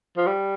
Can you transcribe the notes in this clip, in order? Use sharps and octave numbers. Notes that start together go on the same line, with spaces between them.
F3
G3